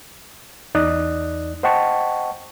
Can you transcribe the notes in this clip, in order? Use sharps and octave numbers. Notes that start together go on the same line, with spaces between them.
E2 D#4 D5 D#6 F#6
C5 D#5 F#5 G5 A5 C#6